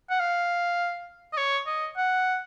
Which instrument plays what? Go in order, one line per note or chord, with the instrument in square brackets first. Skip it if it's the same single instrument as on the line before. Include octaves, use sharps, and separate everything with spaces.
[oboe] F#5
F5
D#5
C#5
D#5
F#5